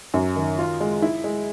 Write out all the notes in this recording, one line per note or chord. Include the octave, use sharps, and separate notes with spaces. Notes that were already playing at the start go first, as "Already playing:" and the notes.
F#2
D#3
F4
G#3
E4
G#3